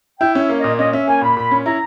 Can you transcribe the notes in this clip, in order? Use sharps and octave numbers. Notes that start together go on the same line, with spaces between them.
E4 G5
C#4 E5
A#3
A#2 D#5
C#4 D#5
C#4 E5
A#3 G#5
A#2 B5
A#2 B5
C#4
E4 A#5